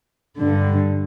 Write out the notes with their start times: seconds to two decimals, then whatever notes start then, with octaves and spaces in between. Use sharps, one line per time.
0.39 G2 D3